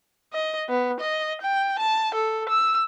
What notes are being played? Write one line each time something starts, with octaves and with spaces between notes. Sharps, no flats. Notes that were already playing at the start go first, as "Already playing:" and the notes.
D#5
B3
D#5
G5
A5
A4
E6